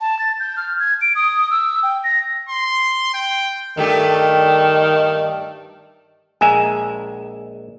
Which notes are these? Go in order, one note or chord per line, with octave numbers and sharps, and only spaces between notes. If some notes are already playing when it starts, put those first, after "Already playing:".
A5
A6
G6
F6
G#6
D7
D#6
E6
G5
A#6
C6
G5
G2 D#3 A3 G4
A#1 G#3 E5 G#5 A#5